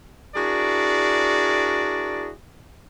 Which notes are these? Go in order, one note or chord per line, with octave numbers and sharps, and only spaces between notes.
D4 E4 F#4 G#4 A#4 D5